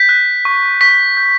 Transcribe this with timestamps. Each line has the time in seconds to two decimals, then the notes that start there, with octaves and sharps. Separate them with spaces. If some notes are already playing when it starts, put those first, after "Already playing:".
Already playing: G6 B6
0.09 F#6
0.45 C#6
0.81 C#6 B6
1.17 G6